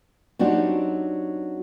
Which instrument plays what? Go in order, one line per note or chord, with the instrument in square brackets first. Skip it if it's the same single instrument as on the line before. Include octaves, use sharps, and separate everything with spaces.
[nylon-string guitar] F#3 C4 D4 D#4 F#4 G4